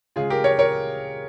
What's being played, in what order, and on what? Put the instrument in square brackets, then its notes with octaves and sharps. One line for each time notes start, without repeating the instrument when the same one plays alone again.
[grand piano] C#3 G#3 F4 G#4
G4 A#4
A#4 C#5
A#4 C#5